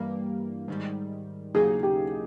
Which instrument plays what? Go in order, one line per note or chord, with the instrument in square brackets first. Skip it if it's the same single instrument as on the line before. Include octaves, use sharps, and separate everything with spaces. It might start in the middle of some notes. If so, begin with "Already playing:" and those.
Already playing: [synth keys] G2 E3 G3 A#3
G#2 D#3 G3
[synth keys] D#2 C#3 F#3 A#3 D#4 [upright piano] G#4
[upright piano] G4